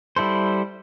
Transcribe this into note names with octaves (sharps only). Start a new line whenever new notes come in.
G3 E4 A4 C5